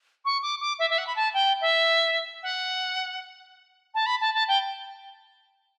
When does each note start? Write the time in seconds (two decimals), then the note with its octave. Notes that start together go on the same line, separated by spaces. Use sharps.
0.25 C#6
0.42 D6
0.60 D6
0.79 E5
0.89 E5
0.98 F#5
1.06 B5
1.16 A5
1.33 G5
1.61 E5
2.42 F#5
3.94 A5
4.06 B5
4.20 A5
4.34 A5
4.48 G5